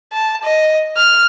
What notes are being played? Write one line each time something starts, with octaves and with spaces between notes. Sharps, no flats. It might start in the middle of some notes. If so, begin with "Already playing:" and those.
A5
D#5
F6